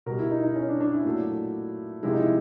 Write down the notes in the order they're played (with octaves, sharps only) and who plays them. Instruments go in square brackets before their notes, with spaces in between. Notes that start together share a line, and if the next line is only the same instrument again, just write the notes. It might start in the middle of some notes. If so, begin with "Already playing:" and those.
[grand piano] B2 G3 A#4
E4
D#4
D#4
C#4
D4
D4
E4
A#2 F#3 A3
C3 F3 G#3 E4
D#4
E4